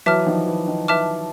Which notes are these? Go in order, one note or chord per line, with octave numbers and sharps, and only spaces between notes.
E3 F#3 B4 E5 A5 D6 F6
D#3 F3
E3
D#3
B4 E5 A5 D6 F6